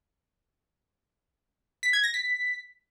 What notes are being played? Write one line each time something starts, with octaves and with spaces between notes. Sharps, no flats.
B6
G#6
A#6
B6